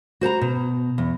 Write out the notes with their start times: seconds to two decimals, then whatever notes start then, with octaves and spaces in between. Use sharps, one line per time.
0.21 F#4 C5 A5 A#5
0.41 B2
0.98 E2